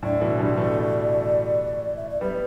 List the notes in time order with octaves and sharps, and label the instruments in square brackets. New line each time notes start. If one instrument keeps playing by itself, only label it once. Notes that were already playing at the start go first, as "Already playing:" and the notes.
[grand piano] A2 D3 [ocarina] D5
[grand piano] B2 E3
D3 G3
E3 A3
[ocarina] E5
D5
[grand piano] G3 B3 [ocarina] B4